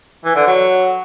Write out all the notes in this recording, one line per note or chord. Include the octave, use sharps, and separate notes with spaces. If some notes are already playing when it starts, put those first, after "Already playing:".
E3
D3
F#3